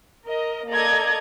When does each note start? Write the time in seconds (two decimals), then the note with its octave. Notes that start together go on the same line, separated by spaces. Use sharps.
0.25 A#4 D#5
0.68 A#3 A4 D5 D#5 A#5 G#6